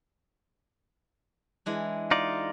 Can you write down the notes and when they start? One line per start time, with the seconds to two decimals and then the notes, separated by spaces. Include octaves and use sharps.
1.66 E3 G#3 D4
2.11 D#4 F4 D5